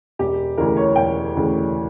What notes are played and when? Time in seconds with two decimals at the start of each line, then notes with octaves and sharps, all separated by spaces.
0.19 E1 G4
0.57 D2 C#3 E3 A#4
0.77 C#5
0.96 E1 G5
1.35 D2 C#3 E3